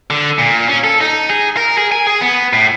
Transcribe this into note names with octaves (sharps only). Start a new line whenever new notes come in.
D3
A#2
C#4
A4
D#4
G#4
A#4
G#4
G#5
G#4
B3
A2